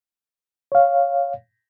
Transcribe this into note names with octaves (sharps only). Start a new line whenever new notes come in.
C#5 F5